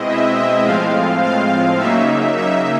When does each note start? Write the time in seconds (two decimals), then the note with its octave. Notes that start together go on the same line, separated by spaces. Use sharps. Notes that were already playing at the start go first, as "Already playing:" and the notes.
Already playing: B2 G#3 C4 E4 D#5
0.09 E5
0.37 E5
0.65 A2 F3 G#3 C4 F4 F5
1.23 F5
1.79 C#3 F#3 A#3 D#4 E5
2.37 E5